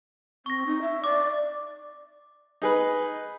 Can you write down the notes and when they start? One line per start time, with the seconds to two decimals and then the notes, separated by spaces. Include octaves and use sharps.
0.46 C4 C#6 A#6
0.67 D#4
0.82 E5
1.04 D5 D6
2.62 D#4 G#4 B4